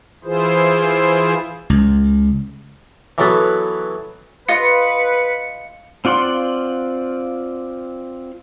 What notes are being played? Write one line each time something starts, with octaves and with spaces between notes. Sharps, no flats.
E3 E4 F4 G#4 C5
C#2
E3 F#3 B3 A4 B4
F4 B4 D#5 C#7
C4 F4 D5 F#5 C6